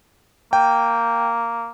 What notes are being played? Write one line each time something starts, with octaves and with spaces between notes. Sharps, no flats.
A#3 G5